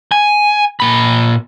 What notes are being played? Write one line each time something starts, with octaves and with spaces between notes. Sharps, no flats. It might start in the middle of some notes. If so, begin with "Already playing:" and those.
G#5
A#2 B5